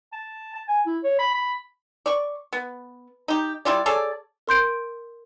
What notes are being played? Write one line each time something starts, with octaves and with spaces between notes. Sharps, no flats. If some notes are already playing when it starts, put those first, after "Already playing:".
A5
A5
G#5
E4
C#5
B5
B5
D5 C#6
B3
D#4 G4
G3 E4 F4 D5
G#4 A4 C#5 D5
A#4 C6 G6 D7